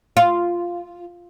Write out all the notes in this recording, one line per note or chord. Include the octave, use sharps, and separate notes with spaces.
F4